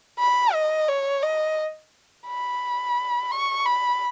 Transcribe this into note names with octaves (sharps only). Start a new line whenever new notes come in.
B5
D#5
C#5
D#5
B5
C#6
B5